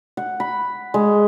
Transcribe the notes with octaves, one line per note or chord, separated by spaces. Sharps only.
F#5
B5
G#3